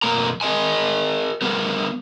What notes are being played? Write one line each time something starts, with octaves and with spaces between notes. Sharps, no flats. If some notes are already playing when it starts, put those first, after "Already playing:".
F#2 B2 A#3 A#4 A#5
G#4 A#4 D#5 G#5
G3 B3 A#4